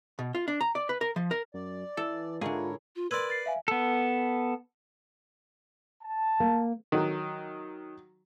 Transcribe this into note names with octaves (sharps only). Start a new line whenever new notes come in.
B2
F4
D4
A#5
D5
B4
A#4
F3
A#4
F#2 D5
E3 A4
G#2 D3 E4 F4 G#4 A#4 C#5
F4
A#4 B4 D5 C6 E6 G#6
A6 C7
E5 F5 G#5
B3 A4
A5
A#3
D#3 F#3